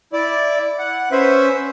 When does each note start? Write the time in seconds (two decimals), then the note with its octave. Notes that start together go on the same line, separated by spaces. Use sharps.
0.13 E4 D5
0.79 F#5
1.12 C#4 B4 C5 E5